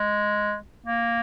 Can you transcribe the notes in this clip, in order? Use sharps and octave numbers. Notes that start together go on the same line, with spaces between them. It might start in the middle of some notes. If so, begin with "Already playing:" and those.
Already playing: G#3
A#3